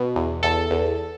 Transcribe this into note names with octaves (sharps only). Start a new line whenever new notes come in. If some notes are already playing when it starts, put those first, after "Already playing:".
Already playing: B2
E2
E2 A4
E2